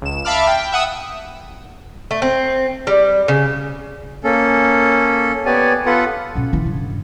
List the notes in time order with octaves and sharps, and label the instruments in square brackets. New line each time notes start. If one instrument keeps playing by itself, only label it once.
[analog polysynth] C#2 E7
E5 F5 A5 B5 D6 F6
G5
E5 F#5 D#6 E6
[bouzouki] A3
C4
G3
C#3
[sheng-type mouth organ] A#3 C#4 A4
B3 G4 C#5 D5 G#5
B3 F4 A4 B4 F#5
[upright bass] B2 C#4
E3 E4
G2 C#3